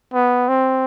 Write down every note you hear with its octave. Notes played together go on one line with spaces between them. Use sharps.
B3
C4